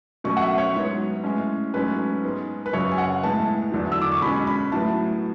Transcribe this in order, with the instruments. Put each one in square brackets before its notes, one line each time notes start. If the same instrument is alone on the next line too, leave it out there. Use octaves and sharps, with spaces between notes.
[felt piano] B2 F#3 A3 C#4 C#6
F#5
E5
C#5
G#2 F#3 B3
A2 G#3 C#4
G#2 F#3 A3 C#4 B4
G#2 G#3 B3
B4
F#2 C#3 F#3 C#5
G#5
F#5
A2 G#3 B3 A5
E2 D3 F#3
E6
D6
C#6
B2 G#3 C#4 B5
B5
A2 F#3 B3 A5